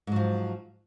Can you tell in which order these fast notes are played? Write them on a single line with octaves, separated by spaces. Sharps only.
G#2 F#3 F3